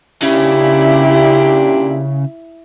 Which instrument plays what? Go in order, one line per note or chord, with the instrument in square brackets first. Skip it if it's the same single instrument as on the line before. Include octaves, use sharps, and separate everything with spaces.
[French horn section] A#2 D4 G4 [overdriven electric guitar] C#3 [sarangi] E4